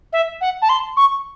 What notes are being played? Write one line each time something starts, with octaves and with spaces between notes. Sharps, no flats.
E5
F#5
A5
C6
C#6